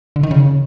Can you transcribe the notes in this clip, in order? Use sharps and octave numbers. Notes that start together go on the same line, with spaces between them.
D3
D#3
C#3